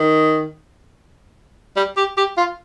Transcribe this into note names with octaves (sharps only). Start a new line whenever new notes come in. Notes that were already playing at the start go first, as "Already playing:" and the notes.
Already playing: D#3
G3
G4
G4
F4